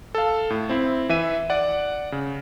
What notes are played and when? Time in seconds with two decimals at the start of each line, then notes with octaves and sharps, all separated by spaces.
0.15 A4 F5
0.50 A2
0.69 C4 E4
1.09 E3 E5 D#7
1.50 D5 F#5
2.12 C#3